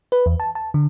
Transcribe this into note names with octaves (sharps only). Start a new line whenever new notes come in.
B4
E2
A5
A5
D3